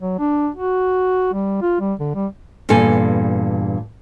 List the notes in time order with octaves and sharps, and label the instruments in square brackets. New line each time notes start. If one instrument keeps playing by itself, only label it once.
[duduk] F#3
D4
F#4
G3
F4
G3
D3
G3
[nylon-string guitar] E2 G2 A#2 A4 G#5